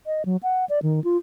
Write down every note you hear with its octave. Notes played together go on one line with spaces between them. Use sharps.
D#5
F#3
F#5
D5
D#3
F4